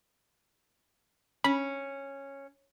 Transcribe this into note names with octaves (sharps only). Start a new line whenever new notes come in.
C#4 B5